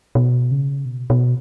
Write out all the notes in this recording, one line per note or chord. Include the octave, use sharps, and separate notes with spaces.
B2
C#3
B2
B2